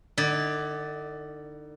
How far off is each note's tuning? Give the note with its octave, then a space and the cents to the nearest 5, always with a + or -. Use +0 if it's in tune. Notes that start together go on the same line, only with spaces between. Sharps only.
D3 +35 D#4 +45 D5 +0